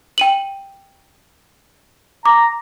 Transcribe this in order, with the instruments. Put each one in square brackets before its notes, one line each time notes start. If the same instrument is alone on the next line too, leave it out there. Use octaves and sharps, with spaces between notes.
[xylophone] G5 D#7 F#7
[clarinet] A#5 [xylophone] D6